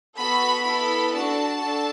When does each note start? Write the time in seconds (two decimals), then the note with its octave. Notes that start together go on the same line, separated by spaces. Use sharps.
0.17 B3 F#4 A4 B5
0.65 B3 E4 A4 B5
1.13 D4 F#4 A4 A5
1.61 D4 A4